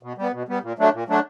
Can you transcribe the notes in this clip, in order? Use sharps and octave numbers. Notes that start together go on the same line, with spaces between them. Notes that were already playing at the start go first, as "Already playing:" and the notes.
B2
G3 B3
B2
G3 B3
A#2
F#3 A3 D4
A#2
F#3 A3 D4